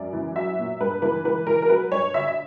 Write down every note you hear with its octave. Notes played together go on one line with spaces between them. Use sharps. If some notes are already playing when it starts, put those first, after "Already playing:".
Already playing: F#2 D5
E3
F#3 E5
A#2
G2 B4
E3 B4
E3 B4
E3 A#4
A#4
F#3 B4
G2 C#5
D3 E5
E5